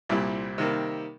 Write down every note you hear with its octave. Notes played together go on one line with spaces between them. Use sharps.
C2 A#2 G3 C4 E4
C3 D#3 G3 A#3